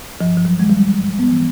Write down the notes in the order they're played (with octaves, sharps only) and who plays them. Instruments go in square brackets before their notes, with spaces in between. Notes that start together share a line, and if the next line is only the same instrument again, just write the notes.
[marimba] G2 F3
F3
F#3
D#3 G#3
G3
G#2 G3
B3
E3